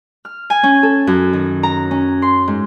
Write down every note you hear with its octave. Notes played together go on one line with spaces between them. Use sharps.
F6
G#5
C#4
A4
F#2
D#3
A#5
C#4
C6
G#2